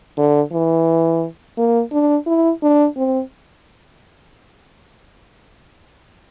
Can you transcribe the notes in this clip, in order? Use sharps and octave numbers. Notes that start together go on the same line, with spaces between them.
D3
E3
A#3
D4
E4
D4
C4